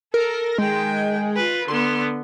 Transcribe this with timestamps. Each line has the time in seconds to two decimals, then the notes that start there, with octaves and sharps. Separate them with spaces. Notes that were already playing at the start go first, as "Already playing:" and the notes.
0.14 A4 A#4
0.58 D#3 G#3 G5
1.36 F4 B4
1.68 D3 B3 C6